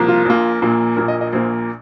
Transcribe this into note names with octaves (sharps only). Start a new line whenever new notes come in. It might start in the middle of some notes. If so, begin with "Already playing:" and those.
Already playing: C2 F3 A#3
F4
A#1 A#2 A#3 F4
A#1 A#2 A#3
A#1 A#2 A#3 A#4
D#5
D#5
A#1 A#2 A#3 C5